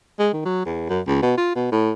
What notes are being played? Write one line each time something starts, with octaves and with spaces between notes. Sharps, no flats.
G#3
D#3
F#3
E2
F#2
C#2
B2
F4
B2
A2